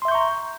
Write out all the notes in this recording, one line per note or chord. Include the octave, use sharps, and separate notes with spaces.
E5 A#5 C6 C#6 G6